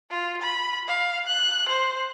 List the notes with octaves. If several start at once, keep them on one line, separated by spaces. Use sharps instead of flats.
F4
B5
F5
F#6
C5